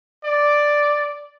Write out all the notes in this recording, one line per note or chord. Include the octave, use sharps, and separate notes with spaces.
D5